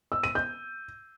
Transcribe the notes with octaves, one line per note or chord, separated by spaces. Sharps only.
E6
D#7
G6